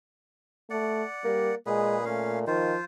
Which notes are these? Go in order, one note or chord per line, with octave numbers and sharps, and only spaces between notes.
A3 D5 F#5
G3 A#3
A#2 G#3 G#4 B4
A3 C#4 F5
D#3 F3 F4 C5